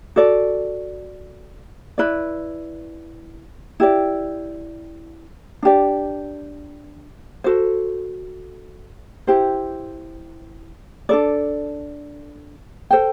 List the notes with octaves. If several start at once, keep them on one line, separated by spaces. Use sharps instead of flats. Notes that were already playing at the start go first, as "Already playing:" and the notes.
F#4 A4 D5
E4 B4 D5
E4 G4 D5
D4 G4 D5
F#4 A4 C5
E4 G4 C5
D4 A4 D5
A4 C5 G5